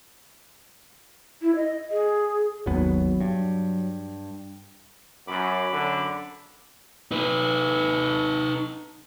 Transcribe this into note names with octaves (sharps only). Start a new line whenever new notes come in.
E4
D#5
G#4
G#1 D#2 F#3 B3
G2
F#2 B5 D6
F#2 D3
D#4 B4